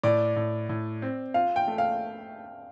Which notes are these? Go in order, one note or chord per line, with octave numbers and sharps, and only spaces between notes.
A2 D5
A2
A2
C4
F4 F5
G5
A3
F5